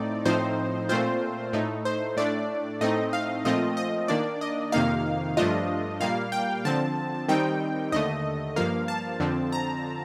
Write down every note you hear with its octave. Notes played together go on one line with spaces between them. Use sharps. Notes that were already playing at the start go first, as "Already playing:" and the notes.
Already playing: A2 A3 C4 D#4 D5
A2 F3 C4 D#4 C5
A#2 A3 C4 F4 C5
A2 A3 D#4
C5
A2 A3 D4 D5
A2 A3 C4 D#4 D#5
F5
A#2 F3 A3 C4 F4 D#5
D#5
D#3 A#3 D4 D5
D#5
F2 C3 D#3 A#3 D#4 F5
G2 F3 A3 D4 F4 D#5
A#2 G3 A#3 F5
G5
D3 F3 C4 A5
D#3 G3 C4 D#4 G5
D#2 D3 A3 D#5
G2 F3 A#3 F5
A5
F2 D3 F3 C4
A#5